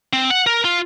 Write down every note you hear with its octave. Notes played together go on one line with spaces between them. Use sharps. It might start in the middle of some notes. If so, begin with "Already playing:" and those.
C4
F#5
A#4
F4